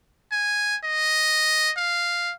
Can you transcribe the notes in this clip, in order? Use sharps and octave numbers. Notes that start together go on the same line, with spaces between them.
G#5
D#5
F5